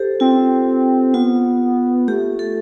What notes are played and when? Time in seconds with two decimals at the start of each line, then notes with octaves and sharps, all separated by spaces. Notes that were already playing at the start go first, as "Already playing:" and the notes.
Already playing: G4 A4 C5
0.20 C4 F4
1.14 B3 F4
2.08 A3 G4
2.39 A4